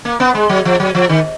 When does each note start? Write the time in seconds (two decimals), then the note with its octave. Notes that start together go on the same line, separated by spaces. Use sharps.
0.05 A#3
0.20 B3
0.35 G#3
0.49 F#3
0.65 F3
0.80 F#3
0.95 F3
1.09 D#3